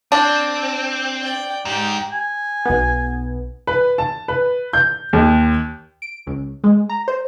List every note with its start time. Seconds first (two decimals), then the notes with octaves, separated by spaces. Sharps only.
0.12 C4 D4
1.21 D5 G5
1.65 G#2 G4 G5
2.12 G#5
2.65 B1 B3
3.67 B4
3.98 A5
4.28 B4
4.73 G6
5.13 D#2
6.02 D7
6.27 C#2
6.64 G#3
6.89 A#5
7.08 C5